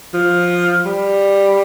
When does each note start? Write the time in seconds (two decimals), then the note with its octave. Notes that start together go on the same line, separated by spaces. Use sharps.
0.14 F3
0.86 G3